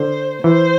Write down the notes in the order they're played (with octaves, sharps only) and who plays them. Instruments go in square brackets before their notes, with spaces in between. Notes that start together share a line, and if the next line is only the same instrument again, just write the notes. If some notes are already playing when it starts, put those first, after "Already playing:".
Already playing: [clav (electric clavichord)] D3 [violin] C5
[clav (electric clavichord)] E3 [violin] C5